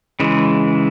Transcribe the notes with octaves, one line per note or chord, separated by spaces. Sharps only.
C#3 E3 G#3